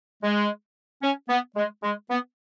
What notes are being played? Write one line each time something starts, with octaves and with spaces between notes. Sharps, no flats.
G#3
C#4
B3
G#3
G#3
B3